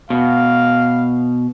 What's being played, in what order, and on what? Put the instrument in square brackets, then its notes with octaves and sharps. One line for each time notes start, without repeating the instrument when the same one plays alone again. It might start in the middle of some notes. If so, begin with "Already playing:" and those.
[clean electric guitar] B2 [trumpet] F5